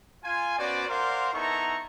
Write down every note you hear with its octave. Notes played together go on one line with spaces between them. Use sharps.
F4 G#5
B3 C#4 F#4 C5 D5
A#4 C5 D5 F5 F#5 C6
B3 D#4 E4 A4 A#5 C#6